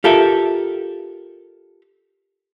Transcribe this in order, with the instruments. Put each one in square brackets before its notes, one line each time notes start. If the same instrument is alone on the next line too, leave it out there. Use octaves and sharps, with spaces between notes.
[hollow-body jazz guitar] F4 G4 A4 A#4 E5